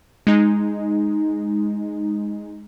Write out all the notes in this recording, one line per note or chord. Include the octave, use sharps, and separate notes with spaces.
G#3 D#4